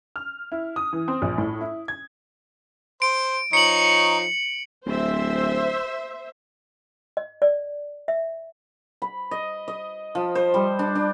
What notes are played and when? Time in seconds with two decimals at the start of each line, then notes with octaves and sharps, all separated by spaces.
0.16 F6
0.52 E4
0.76 D#6
0.93 E3
1.08 C4
1.22 A#1
1.38 A2
1.61 E4
1.88 G#6
3.02 C5 D7
3.53 F3 D#4 C#5 C#7 F#7
4.86 D1 C5 E5
7.17 D#5
7.42 D5
8.08 E5
9.02 B5
9.31 D#5
9.68 D#5
10.15 F3
10.35 C5
10.54 G3
10.79 D4
10.95 D4